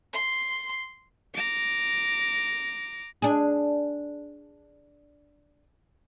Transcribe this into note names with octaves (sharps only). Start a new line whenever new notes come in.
C6
A#5 D6
D4 G#4